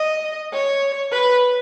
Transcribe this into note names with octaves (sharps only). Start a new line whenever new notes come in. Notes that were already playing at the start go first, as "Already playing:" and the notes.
Already playing: D#5
C#5
B4